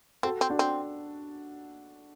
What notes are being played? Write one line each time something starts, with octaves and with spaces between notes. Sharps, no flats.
C4 F#4 A4
C4
D4 F#4
C4